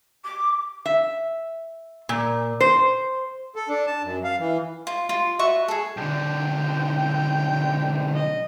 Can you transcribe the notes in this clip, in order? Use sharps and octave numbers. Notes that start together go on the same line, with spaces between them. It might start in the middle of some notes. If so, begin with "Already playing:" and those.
D6
E5
A#2
C5
A4
D4
A5
F#2
F5
E3
F4
F4
F#4 B4 E5 C#6
G#4 A4
B1 D3 G5
D#5